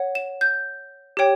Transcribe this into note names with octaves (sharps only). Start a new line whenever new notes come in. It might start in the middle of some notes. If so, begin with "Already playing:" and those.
Already playing: C#5 F#5
E7
G6
G4 C#5 G5